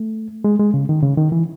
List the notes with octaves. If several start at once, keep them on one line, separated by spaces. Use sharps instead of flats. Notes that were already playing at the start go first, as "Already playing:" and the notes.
Already playing: A3
G#3
G#3
C#3
D#3
C#3
D#3
E3